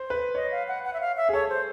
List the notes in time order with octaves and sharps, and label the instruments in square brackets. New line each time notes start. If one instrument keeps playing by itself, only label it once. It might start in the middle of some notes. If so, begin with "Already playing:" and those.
Already playing: [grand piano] C5
B4
[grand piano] C#5 [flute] D#5
[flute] F5
F#5
F#5
E5
F5
E5
[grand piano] G#4
[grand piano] A4 [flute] C#5
[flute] C5